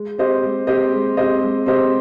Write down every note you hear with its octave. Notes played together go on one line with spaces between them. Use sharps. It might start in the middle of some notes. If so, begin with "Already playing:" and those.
Already playing: G#3
C4 G4 C5 D#5
G#3
C4 G4 C5 D#5
G#3
C4 G4 C5 D#5
G#3
C4 G4 C5 D#5